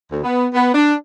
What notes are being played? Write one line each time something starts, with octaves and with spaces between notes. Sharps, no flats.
D2
B3
B3
D4